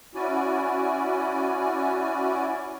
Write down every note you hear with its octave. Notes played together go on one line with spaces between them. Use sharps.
C#4 E4 F#4 D5 G#5